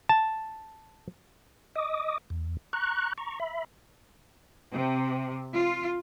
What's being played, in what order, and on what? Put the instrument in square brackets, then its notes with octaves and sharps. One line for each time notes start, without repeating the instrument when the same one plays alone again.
[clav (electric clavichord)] A5
[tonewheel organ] D#5 D6 D#6
E2
A#5 C#6 F#6
A#5 C#6
E5 B5
[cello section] C3
F4